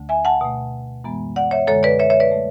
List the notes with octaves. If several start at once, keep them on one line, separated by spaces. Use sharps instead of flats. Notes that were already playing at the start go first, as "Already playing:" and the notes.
Already playing: D2 D3 A3
E5 G#5
F#5 A5
B2 A3
F#2 E3 G#3 B3
D5 F#5
C#5 E5
F#2 D3 G#3 A4 C#5
B4 D5
C#5 E5
C#5 E5
B4 D5
F#3 A3